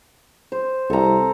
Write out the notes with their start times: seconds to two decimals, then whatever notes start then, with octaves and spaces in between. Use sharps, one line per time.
0.52 C5
0.90 C2 A4 A#5